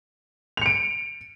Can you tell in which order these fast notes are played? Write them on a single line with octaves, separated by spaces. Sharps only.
F7 C#7 D7